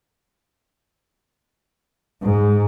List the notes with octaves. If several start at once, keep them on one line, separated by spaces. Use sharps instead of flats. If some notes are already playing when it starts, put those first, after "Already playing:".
G#2